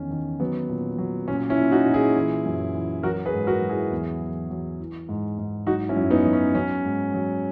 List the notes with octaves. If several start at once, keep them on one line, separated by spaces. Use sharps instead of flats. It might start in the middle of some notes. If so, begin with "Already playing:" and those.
Already playing: E2 D#3 C#4
D#3
F#3 B3
A#2
F#3
A#2 C#4
C#4 E4
A#2
D#4 F#4
A#2
E4 G#4
E3
F#2
E3
F#3 F#4 A#4
G#4 B4
G#2
F#4 A#4
F#3
E4 G#4
E2
F#3
F#3
E3
G#2
G#2
F#3 D#4 F#4
C#4 E4
F#2
B3 D#4
F#3
C#4
F#3 C#4
G#2
F#3